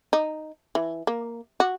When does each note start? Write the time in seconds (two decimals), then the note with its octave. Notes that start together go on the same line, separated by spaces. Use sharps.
0.13 D#4
0.75 E3
1.07 A#3
1.60 F#4